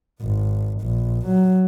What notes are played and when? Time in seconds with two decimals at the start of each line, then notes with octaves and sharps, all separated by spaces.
0.22 G#1
0.81 A#1
1.27 F#3